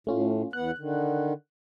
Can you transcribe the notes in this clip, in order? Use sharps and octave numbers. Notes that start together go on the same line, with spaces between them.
A2 A3 C#4 F4
E2 B3 F#5 F#6
D3 D#3